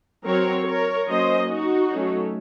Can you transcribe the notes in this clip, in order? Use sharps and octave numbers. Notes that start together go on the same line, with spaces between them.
F#3 C4 A#4 C#5
A#4 C#5
F#3 A#3 C#4 C5 D#5
D#4 F#4
F#3 A3 C#4